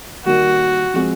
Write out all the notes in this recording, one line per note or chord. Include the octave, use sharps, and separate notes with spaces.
D#3 G3 A#3 F#4
F3 G#3 C4